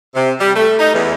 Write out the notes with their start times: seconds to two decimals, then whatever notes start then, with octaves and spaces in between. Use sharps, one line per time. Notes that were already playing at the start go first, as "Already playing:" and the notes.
0.15 C3
0.39 G3
0.55 A3
0.79 D#4
0.93 E2